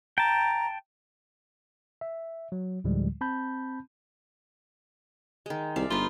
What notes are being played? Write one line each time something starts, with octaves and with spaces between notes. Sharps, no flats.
G5 A5 A#5
E5
F#3
D2 A2 D3 F3 G3 G#3
C4 A5 B5 G6
D#3 G#3
C2 D5 E5 F5
G1 D#4 F4 B4